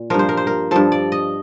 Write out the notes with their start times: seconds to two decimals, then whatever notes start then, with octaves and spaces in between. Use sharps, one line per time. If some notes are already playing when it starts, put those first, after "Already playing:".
Already playing: A#2
0.10 G2 F3 A#4
0.19 C5
0.29 A#4
0.37 C5
0.47 A#4
0.71 G2 F3 A4
0.92 D5
1.12 D#5